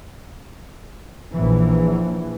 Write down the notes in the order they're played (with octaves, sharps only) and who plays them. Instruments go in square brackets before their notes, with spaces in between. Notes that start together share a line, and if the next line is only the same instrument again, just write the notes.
[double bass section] A#1 E3